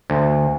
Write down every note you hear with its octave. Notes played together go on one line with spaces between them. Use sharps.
D2